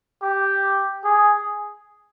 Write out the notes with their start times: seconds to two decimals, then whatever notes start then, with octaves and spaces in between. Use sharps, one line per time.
0.23 G4
1.04 G#4